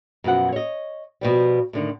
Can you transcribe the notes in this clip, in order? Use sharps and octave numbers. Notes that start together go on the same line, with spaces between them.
F#2 B2 F3 F#5
C#5 D#5
B2 F3 G3
A2 D3 D#3